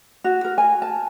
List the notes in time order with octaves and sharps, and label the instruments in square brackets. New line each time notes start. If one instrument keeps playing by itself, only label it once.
[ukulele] F#4
A#4
G#5
A5